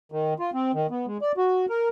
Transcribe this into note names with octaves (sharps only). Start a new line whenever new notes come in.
D#3
F4
C4
D#3
B3
G#3
D5
F#4
A#4